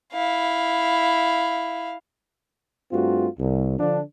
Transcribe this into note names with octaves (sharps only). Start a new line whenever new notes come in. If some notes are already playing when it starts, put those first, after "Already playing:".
E4 F5
G2 A3 C4 F4 F#4
C2
D3 F3 D4